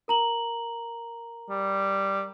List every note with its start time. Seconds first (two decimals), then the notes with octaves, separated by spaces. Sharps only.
0.08 A#4 A#5 F#7
1.50 G3